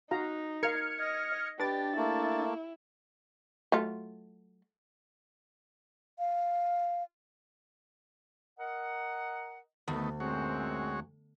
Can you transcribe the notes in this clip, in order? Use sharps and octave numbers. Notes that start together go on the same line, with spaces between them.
D#4 F#4 F5 A#5
A#4 F5 F6 G#6 C#7
D#5
D4 G4 B4 D6 A6
A3 A#3 E4
F#3 A3 F4
F5
A#4 D#5 F#5
D2 D#3 A3 B3
F#2 A#2 G#3 C4 F#4 C#5